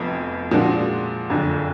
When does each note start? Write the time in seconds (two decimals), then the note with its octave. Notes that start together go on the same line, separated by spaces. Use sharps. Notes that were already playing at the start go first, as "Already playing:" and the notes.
Already playing: F1 F2 F3 B3
0.51 A#2 F3 G#3 D4 F#4
1.29 F#1 F2 D3